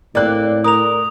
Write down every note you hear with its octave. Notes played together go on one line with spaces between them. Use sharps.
A2 A#3 C4 D5 F#6
A#4 D#6 F7